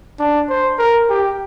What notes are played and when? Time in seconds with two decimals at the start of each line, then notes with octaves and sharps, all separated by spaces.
0.19 D4
0.49 C5
0.79 A#4
1.10 G4